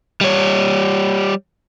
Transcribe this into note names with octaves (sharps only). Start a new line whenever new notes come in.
G3 C#5